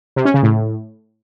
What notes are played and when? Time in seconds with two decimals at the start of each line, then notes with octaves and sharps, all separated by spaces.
0.16 C3
0.25 C#4
0.34 C#3
0.43 A2